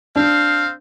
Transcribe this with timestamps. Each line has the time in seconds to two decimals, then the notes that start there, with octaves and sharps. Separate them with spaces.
0.16 C4 D4 C5 F5